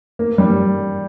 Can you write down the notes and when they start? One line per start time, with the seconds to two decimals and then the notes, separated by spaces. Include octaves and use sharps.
0.19 A#3
0.38 G3